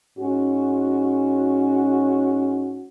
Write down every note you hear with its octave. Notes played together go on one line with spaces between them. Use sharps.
G#2 C#4 F#4